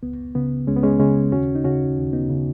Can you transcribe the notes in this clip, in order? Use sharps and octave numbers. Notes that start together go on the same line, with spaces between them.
C#2 B3
C#3 B3
C#2 G#3 C#4
B3
G#3 C#4
C#3 G#3 C#4
D#2 C#4 F#4
D#4
C#3 C#4 F#4
D#2
B3 D#4
C#3